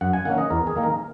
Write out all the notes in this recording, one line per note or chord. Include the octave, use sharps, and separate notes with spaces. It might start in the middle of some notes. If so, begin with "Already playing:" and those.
F#2 F#5
G#5
D#3 A#3 C#4 F#5
D#5
E2 A#4
G#4
D#3 A#3 D#4
A#4